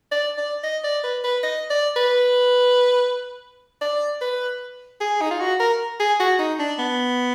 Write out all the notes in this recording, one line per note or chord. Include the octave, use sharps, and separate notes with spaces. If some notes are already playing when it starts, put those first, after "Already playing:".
D5
D5
D#5
D5
B4
B4
D#5
D5
B4
D5
B4
G#4
D#4
F4
F#4
A#4
G#4
F#4
D#4
D4
B3